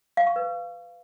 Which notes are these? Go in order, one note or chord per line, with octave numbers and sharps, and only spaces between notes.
F5
C#6
B4